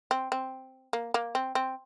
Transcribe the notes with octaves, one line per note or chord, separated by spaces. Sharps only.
C4
C4
A#3
A#3
C4
C4